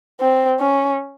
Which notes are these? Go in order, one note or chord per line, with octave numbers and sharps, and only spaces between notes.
C4
C#4